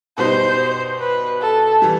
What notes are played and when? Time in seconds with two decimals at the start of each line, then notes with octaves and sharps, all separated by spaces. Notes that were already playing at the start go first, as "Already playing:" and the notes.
0.18 B2 G3 B3 D#4 C5
0.99 B4
1.41 A4
1.82 E3 G3